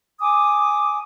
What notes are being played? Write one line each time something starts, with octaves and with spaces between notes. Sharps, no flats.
G#5 D6 D#6